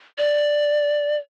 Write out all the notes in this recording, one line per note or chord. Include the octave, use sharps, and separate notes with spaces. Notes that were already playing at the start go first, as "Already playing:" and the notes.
D5